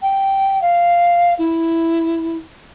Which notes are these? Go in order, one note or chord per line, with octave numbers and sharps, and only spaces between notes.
G5
F5
E4